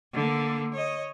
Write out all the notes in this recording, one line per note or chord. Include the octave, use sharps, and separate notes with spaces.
D3 A#3
C#5 D#5